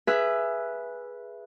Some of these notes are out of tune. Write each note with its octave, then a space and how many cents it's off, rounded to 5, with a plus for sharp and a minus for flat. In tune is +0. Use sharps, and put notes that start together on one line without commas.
G#4 +0 B4 -10 E5 +20